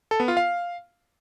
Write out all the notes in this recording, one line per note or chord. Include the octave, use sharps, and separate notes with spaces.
A4
B3
F4
F5